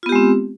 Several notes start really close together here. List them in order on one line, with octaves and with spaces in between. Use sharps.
F4 B3 G4 G#3 C4